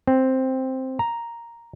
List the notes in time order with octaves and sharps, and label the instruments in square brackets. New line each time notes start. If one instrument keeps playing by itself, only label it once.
[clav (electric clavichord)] C4
A#5